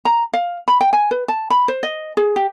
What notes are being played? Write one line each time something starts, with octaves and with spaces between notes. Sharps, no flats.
A#5
F5
B5
G5
G#5
B4
A5
B5
C5
D#5
G#4
G4